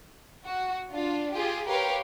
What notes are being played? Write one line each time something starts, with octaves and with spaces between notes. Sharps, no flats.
F#4
D4 F4
F4 G4 G#4
G4 A#4 B4 C#5 F5